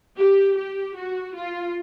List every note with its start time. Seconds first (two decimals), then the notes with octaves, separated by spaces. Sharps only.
0.17 G4
0.57 G4
0.96 F#4
1.35 F4